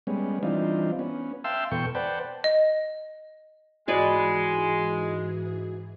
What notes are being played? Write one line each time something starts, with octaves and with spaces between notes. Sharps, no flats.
G3 G#3 B3 C#4
E3 G3 C4 D4 D#4 F4
B3 C#4
E5 F5 G5 A5 C6 E6
E2 B2 A4 G5 C#6
B4 C5 D5 F#5 G5 A5
D#5
G#2 E3 G#3 F#4 G#4 B4 D5